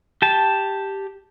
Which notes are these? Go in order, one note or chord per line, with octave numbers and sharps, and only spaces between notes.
G4 A5